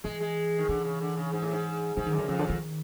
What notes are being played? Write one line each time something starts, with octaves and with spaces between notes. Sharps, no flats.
E3 G#3
G#3
D#3
D3 E3
C#3
D3
C#3
G#2
A2
G#2
G#2 E3
D#3
F#2
D3
F2 C#3
D3
D#3